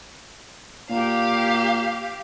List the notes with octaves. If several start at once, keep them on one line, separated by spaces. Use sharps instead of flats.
A#2 G4 F5